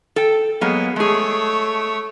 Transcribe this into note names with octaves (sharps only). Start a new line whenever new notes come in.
A4 G5
F#3 G#3 A#3 B3
G#3 A3 G#4 C#5